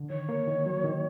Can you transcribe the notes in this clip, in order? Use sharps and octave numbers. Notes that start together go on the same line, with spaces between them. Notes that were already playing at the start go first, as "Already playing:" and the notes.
Already playing: D3
D#3 C#5
A#3
D#3
F#3
D#3